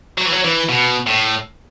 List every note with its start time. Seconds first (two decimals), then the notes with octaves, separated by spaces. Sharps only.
0.18 F#3
0.26 E3
0.32 F#3
0.44 E3
0.69 B2
1.07 A2